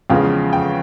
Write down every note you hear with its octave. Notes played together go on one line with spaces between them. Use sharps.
E2 C#3 F3 G#3 F5 G5
G5